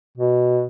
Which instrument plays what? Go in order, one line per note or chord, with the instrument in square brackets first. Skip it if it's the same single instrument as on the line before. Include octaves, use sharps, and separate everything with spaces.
[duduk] B2